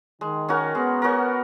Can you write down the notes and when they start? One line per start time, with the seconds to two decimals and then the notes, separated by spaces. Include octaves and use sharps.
0.21 D#3 G#3
0.49 C#4 F#4 A#4
0.75 G#3 B3
1.02 C#4 F#4 A#4